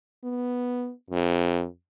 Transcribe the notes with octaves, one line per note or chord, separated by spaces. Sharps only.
B3
F2